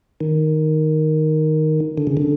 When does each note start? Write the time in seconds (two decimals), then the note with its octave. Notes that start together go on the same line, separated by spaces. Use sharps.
0.20 D#3
1.98 D3
2.07 C#3
2.17 D3